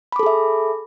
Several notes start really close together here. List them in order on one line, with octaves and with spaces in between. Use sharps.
B5 D6 A4 G#4 E5